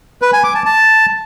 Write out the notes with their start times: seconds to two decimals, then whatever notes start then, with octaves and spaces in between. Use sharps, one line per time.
0.22 B4
0.33 G#5
0.44 D6
0.55 A5
0.65 A5